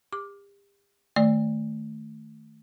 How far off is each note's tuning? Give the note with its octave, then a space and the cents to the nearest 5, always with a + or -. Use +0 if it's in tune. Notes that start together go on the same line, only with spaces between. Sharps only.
G4 +40 D6 +0
D#3 +0 A3 +0 D5 +0